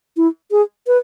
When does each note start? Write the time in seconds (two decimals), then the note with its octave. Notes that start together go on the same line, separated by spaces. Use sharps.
0.17 E4
0.51 G#4
0.87 B4